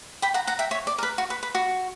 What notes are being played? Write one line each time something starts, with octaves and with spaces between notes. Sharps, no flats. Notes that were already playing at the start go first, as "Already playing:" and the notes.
G5 B5
F#5 A#5
F#5 A#5
E5 G5
C#5 E5
D5
A#4
B4
F#4
B4
B4
F#4